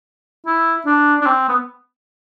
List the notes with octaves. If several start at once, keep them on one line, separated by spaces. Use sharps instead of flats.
E4
D4
D4
C4
B3